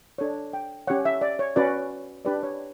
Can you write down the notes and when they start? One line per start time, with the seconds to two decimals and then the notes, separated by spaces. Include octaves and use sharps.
0.18 D4 A4 C#5
0.54 G5
0.87 C#4 G4 C#5 F#5
1.05 E5
1.21 D5
1.39 C#5
1.56 C#4 F#4 B4 D5
2.25 D4 G4 B4 D5
2.43 C#5